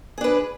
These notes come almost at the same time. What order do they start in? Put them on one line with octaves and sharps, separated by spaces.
G#4 D4 B4